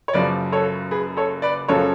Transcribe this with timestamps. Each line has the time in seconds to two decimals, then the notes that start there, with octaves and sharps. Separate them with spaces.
0.08 C#5
0.14 F#1 F#2 C#3 F3 B4 D5
0.52 A4 C#5
0.91 G#4 B4
1.17 A4 C#5
1.42 B4 D5
1.68 F#1 F#2 C#3 F3 A4 C#5